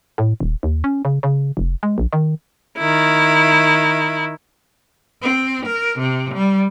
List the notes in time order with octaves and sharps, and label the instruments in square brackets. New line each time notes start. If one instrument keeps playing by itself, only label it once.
[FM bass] A2
D#1
D#2
C#4
C#3
C#3
F1
G#3
A#1
D#3
[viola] D#3 E4
[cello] C4
A#4
C3
G3